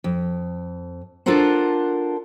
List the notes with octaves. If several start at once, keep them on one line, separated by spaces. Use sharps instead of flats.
F2
D4 F4 A4 A#4 C5 F#5